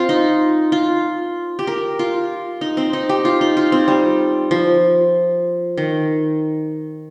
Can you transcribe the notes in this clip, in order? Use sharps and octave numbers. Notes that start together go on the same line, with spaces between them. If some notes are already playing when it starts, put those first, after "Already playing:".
Already playing: C4 F4
D#4
F4
G4
A#4
F4
D#4
C4
D#4
G4
F4
D#4
F4
C4
G3
F3
D#3